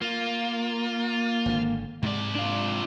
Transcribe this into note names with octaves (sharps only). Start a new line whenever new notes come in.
A#3 F4
G#1 D3
G#2 C3 G#3 D5
D4 F4